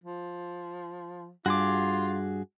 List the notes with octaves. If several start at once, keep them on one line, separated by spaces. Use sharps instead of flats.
F3
G2 F4 F#4 G#4 D6